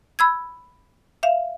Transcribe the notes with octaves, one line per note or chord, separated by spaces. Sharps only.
B5 E6 G#6
E5 F5